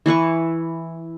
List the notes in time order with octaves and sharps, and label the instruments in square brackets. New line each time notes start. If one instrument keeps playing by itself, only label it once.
[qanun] E3 E4 B4 C#6